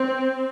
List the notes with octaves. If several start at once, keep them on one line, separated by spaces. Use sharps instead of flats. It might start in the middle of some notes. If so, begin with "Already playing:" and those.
Already playing: C4